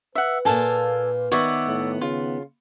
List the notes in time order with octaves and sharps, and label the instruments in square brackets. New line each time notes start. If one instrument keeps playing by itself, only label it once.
[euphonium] B4 [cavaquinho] E5 F#5
[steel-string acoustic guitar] A#2 A#3 F4 [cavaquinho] A4 G#5
[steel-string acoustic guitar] D#3 B3 F#5 [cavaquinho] C#5 D5 E5
[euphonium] A2
[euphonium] C#3 [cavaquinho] F4